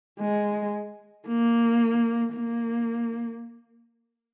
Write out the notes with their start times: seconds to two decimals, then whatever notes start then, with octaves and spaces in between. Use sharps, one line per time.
0.20 G#3
1.27 A#3
2.34 A#3